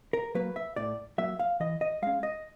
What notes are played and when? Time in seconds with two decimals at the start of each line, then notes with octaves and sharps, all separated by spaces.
0.13 A#4
0.35 F#3 A#3 B4
0.56 E5
0.76 A2 D5
1.18 F#3 A#3 E5
1.40 F5
1.60 E3 D#5
1.81 D#5
2.02 G#3 C#4 F5
2.23 D#5